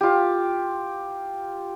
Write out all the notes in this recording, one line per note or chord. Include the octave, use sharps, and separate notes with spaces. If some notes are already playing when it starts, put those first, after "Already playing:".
F4 G4